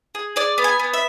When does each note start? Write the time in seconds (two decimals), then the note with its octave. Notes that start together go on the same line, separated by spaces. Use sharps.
0.15 G#4
0.36 G#4 D5
0.58 B3
0.64 G#5
0.79 B3
0.93 E5